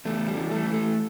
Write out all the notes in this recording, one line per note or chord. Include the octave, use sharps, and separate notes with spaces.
E2 A3
G3
E3
A3
E3
A3